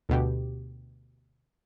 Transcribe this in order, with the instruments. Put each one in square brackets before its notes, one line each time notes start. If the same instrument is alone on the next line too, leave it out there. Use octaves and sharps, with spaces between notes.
[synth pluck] D2 B2 G4